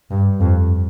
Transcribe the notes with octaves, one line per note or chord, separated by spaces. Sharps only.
G2
F2